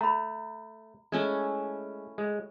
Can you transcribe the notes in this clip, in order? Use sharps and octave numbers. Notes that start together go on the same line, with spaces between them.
A3 A#5 B5
G#3 A3 C#4 E4
G#3